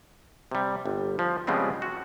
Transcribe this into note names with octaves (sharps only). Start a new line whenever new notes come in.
C3 G3
G1
F3
C#3 F3 G3 G#3 B3 C4
F#4